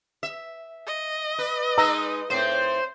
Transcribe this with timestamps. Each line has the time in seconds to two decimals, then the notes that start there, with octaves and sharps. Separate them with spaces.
0.23 E5
0.87 D#5
1.38 B4
1.78 G#3 D#4 B4 A#5 E6
2.30 A2 C4 C5